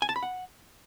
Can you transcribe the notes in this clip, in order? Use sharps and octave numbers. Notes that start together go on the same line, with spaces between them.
G#5
A5
B5
F#5